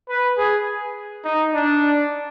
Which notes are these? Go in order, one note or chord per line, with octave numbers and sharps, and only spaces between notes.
B4
G#4
D#4
D4